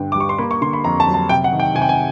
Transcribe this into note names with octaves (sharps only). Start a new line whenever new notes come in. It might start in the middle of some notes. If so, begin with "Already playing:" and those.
Already playing: G2 D3 B3 G5
G3 D6
C#6
C6
A#3 B5
C#6
D3 C6
B5
F2 A#5
A5
F#3
A5
C3 G5
F#5
D#3
G5
C3 G#5
G5
G#5